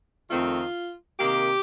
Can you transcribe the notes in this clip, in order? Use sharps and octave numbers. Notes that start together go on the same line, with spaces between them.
F2 D#3 A3 C4 F4
C3 D#3 A#3 G4